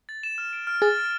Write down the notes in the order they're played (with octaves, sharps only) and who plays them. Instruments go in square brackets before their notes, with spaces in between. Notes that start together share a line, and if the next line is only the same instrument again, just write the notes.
[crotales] A6
E7
F6
D7
F6
[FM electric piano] G#4 [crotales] A6
[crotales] F6